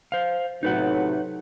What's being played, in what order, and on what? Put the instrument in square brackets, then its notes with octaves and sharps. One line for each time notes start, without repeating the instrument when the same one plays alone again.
[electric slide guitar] C5 F5
[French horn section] A2 C3 F#3 [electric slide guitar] D#4 B4 F#5